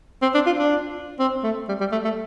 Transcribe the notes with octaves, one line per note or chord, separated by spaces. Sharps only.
C4
D4
F4
D4
C4
A3
G3
G3
A3
A3